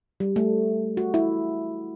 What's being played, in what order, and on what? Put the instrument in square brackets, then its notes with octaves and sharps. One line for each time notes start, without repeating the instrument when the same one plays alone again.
[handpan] G3
A3
F#4
E4